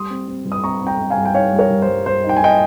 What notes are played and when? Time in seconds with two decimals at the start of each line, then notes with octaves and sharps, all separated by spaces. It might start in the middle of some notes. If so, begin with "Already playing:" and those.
Already playing: G3 C6 D#6
0.10 C4
0.28 C4
0.45 G2
0.52 D#6
0.64 C4 A#5 C#6
0.81 C4
0.87 G5 A#5
0.99 C4
1.10 F5 G#5
1.17 G2
1.25 G5
1.34 D#4 C#5 F5
1.52 G3
1.59 A#4 C#5
1.70 G2
1.82 C5
1.88 G2
2.06 G2 C5
2.24 D#4
2.29 G5
2.37 G#5
2.41 D#4 D#5 G5